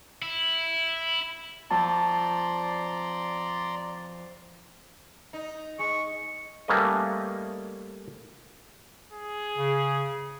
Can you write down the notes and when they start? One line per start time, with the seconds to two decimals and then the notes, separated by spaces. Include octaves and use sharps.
0.22 E4
1.70 F2 D5 A5 A#5 C6
5.33 D#4
5.79 G#3 C#6
6.68 G3 A3 A#3 C#4 B4 D#5
9.12 G#4
9.57 C#3